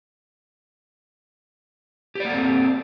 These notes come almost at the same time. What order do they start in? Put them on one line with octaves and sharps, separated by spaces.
G4 D5 A#3 A4 C4